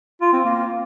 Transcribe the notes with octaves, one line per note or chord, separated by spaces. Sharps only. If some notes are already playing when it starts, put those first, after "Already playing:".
F4
C4
A#3